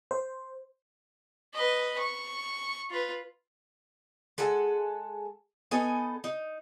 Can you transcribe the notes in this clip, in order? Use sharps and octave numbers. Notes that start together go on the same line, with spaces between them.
C5
B4 D#5
C#6
F4 B4
G#3 A4 F#5 G#5
B3 D#4 A4 G#5
D#4